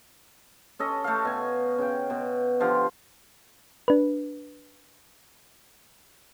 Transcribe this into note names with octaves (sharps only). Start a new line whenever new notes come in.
C#4 A4 D#5
A3 F5
B2 G#5
C#3 G5
B2
D3 F3 G4 F5
D4 B4